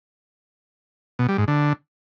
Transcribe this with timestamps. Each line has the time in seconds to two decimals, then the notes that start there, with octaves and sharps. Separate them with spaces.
1.19 B2
1.29 G3
1.38 G#2
1.48 D3